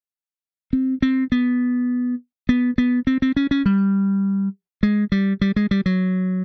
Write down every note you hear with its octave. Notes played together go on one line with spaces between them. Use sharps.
C4
C4
B3
B3
B3
C4
C4
C#4
C#4
G3
G#3
G3
G3
G#3
G3
F#3